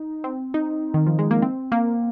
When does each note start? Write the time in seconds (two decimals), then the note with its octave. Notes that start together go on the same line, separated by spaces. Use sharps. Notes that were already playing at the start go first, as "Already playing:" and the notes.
Already playing: D#4
0.24 C4
0.54 D#4
0.94 D#3
1.07 F3
1.19 G#3
1.31 A#3
1.42 C4
1.72 A#3